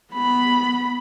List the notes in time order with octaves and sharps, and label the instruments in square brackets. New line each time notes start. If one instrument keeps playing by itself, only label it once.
[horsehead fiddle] B3 B5